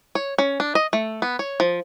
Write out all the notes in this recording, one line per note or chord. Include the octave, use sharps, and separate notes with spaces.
C#5
C#4
D4
D#5
A3
B3
C#5
F3